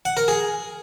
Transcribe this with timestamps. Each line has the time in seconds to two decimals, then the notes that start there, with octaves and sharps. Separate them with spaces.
0.05 F#5
0.17 A#4
0.28 G#4